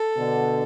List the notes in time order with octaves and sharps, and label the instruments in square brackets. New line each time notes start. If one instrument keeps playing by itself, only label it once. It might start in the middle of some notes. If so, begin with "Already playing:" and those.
Already playing: [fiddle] A4
[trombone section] B2 D3